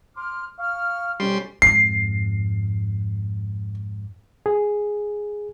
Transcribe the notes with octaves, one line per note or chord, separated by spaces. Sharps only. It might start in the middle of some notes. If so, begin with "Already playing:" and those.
C6 D6 F6
F5 C#6 F6
F2 B2 G3 C#4 C6
F2 G#2 C7
G#4